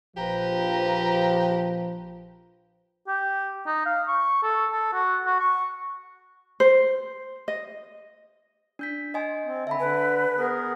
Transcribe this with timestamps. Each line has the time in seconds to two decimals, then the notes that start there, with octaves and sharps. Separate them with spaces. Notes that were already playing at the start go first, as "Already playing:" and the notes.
0.17 A#1 F3 G4 B4 A#5
3.08 G4
3.67 D#4
3.86 F5
4.08 C#6
4.43 A4
4.72 A4
4.94 F#4
5.26 F#4
5.40 C#6
6.60 C5
7.48 D#5
8.79 D4 G6 B6
9.14 D#5 G#5 C6
9.46 C4
9.67 D3 E5 A5 B5
9.80 D3 B4 G#5
10.38 B3 G#4 A#4